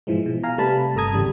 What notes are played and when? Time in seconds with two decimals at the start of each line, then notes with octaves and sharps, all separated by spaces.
0.07 G#2 B2 E3 F3 G#3
0.26 B2
0.43 F5 G#5 A#5
0.58 C3 G3 A3 B4 A5 B5
0.95 G1 A4 A#5 D#6 G#6
1.13 G#1 E2 C#3 G3